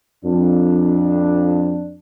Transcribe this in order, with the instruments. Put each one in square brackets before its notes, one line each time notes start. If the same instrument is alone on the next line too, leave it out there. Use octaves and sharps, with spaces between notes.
[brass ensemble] F2 D4